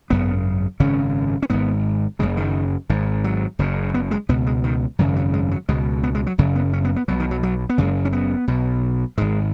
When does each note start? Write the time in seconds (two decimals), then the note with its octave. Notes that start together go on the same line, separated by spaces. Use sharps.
0.10 G#1 F#2 C#3 B3
0.80 G#1 F#2 C#3 C#4
1.42 C#4
1.50 G#1 G#2 B3
2.19 F#1 F#2 C#3 G#3
2.37 D#3
2.89 G#1 G#2
3.24 F#3
3.59 F#1 F#2 C#3
3.94 B3
4.11 G#3
4.29 C#2 B2 B3
4.47 G#3
4.64 D#3
4.99 G#1 F#2 C#3 F#3
5.16 F#3
5.34 G#3
5.51 F#3
5.69 C#2 B2 G#3
6.03 B3
6.15 G#3
6.27 F#3
6.38 F#1 F#2 C#3 F#3
6.56 B3
6.73 C#4
6.85 B3
6.96 B3
7.08 B1 B2 F#3
7.20 D#3
7.31 F#3
7.43 F#3
7.69 B3
7.78 F#1 F#2 C#3 G#3
8.05 C#4
8.12 B3
8.48 B1 B2
9.18 G#1 G#2 G#3